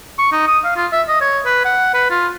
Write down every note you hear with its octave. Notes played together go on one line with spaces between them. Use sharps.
C#6
D#4
D#6
F5
F4
E5
D#5
C#5
B4
F#5
B4
F4